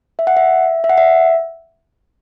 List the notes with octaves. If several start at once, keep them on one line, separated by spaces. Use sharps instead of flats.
E5
F#5
E5
E5
F#5
E5